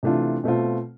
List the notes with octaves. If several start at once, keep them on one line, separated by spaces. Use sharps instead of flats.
C3 E3 A3 D4 F4
B2 A3 C4 F4